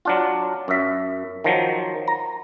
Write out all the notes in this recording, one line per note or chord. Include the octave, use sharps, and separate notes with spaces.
F#3 D4 F4
F#2 E5
D#3 F3 F#3
A#5